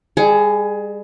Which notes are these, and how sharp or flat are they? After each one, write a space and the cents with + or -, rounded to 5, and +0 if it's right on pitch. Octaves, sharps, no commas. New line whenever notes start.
G3 +45 G#4 +15